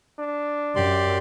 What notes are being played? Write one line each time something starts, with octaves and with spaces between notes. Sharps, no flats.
D4
F#2 G4 D5 C6